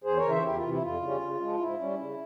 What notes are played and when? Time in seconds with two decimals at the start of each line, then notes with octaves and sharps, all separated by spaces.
0.04 E2 G#4 C5
0.17 A#4 C#5
0.23 C#3 E3
0.30 C5 E5
0.43 E2 E4 G4
0.56 F4
0.63 C3 E3
0.69 E4
0.82 F2 F4
1.02 C#3 G3 C#4
1.21 C#3
1.40 F3 G#3
1.59 G#2 E4
1.79 G3 C#4
1.99 C#3